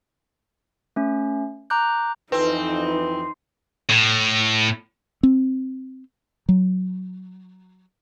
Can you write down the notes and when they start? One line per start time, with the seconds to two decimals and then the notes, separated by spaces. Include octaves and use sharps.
0.96 A3 C#4
1.70 A#5 D6 F#6 G6
2.32 F2 E3 C4 D#4 B4
3.90 A2
5.23 C4
6.49 F#3